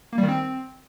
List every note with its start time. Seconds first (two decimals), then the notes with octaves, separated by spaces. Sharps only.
0.13 A#3
0.18 G3
0.23 D#3
0.28 C4